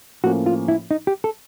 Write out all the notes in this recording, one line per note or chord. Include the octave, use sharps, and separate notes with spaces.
A2 F3 A#3 C#4 F#4
F4
E4
D#4
G4
A4